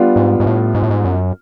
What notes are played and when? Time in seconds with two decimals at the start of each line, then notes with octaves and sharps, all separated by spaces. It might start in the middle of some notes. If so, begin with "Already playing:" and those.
Already playing: G3 B3 D4 F4
0.16 G#2
0.40 G#2
0.46 A2
0.75 G#2
0.83 A2
0.90 G#2
1.04 F#2